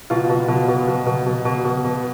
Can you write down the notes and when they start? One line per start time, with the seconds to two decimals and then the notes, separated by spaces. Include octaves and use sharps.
0.10 B2 F4
0.29 B2
0.48 B2
0.68 B2
0.87 B2
1.06 B2
1.26 B2
1.45 B2
1.64 B2
1.84 B2